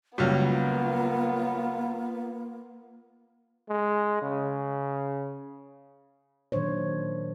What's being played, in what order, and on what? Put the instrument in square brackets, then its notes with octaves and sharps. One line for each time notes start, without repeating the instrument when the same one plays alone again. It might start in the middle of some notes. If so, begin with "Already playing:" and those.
[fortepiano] C#2 F#3 G3 [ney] A#3 [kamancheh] B3 F4
[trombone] G#3
C#3
[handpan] A#2 D#3 F#3 D4 C5 C#5